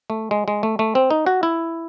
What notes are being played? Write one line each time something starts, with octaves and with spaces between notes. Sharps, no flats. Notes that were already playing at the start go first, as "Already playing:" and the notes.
A3
G#3
G#3
A3
A3
C4
D#4
F#4
E4